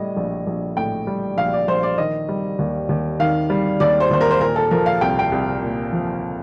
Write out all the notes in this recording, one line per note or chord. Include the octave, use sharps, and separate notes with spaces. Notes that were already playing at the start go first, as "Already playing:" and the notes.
Already playing: A2 G3 D#5
A#1
A#1
A2 G5
G3
A#1 F5
D5
A#1 C5
D5
D#3 D#5
G3
D#2
D#2
D#3 F5
G3
D#2 D5
C5
D#2 C5
A#4
C5
A#2 A#4
A4
F3 A#4
F5
C2 G5
G5
C2
A#2
F3